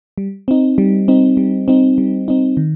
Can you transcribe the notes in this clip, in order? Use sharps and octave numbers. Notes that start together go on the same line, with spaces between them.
G3
C4 D#4
G3
C4 D#4
G3
C4 D#4
G3
C4 D#4
D#3